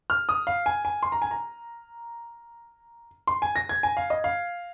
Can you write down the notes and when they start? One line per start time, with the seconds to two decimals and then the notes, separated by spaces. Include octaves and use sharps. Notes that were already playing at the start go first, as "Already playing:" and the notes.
0.10 F6
0.29 D#6
0.47 F5
0.66 G#5
0.85 G#5
1.03 C6
1.12 A#5
1.22 G#5
1.31 A#5
3.27 C6
3.42 G#5
3.56 A#6
3.69 G#6
3.83 G#5
3.97 F5
4.10 D#5
4.24 F5